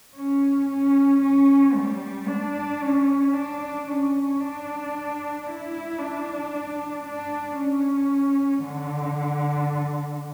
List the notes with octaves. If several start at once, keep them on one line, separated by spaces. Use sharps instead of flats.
C#4
C#4
C#4
G3
D4
C#4
D4
C#4
D4
E4
D4
D4
C#4
D3